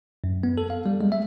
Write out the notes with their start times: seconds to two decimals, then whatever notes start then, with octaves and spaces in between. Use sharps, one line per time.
0.24 F#2
0.43 B3
0.58 A4
0.70 F5
0.86 G3
1.01 G#3
1.12 E5